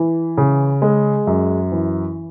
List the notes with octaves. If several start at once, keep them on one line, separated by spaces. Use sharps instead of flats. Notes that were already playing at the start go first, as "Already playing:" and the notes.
Already playing: E3
C#3
G#3
F#2
E3